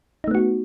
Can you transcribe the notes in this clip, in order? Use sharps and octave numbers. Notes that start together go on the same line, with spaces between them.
A3 B3 D#4 F#4